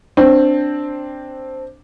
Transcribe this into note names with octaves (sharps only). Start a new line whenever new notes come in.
C4 D4